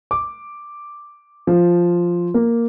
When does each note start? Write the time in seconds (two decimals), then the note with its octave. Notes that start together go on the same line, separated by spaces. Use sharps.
0.11 D6
1.47 F3
2.34 A#3